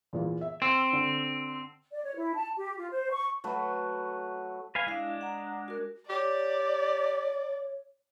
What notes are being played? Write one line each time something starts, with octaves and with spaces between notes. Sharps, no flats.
E2 A#2 E3
E5
C4 E6
D3
D5
C#5
E4
A5
G4
F4
C5
C#6
F#3 A3 F#4 B4
B4 F5 G#5
G#3 D4 E4 F5
F#5 A#5
F#4 A#4
G4 C#5 D5